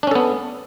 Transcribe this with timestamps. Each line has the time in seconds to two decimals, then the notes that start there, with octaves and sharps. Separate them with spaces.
0.03 D4
0.07 C#4
0.11 A4
0.15 B3